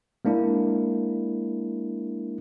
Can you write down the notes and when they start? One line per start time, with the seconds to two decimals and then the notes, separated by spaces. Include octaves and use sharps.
0.25 G#3 A#3 D4 E4